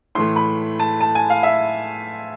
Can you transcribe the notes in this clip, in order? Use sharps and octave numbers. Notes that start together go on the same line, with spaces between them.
A2 E3 A3 C6
B5
A5
A5
G#5
F5
E5